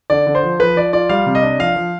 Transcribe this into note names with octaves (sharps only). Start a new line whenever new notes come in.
D3 D5
D3
C5
F3
F3 B4
F3 D5
F4 D5
G3 F5
C3
D#5
D4
F3 F5
F3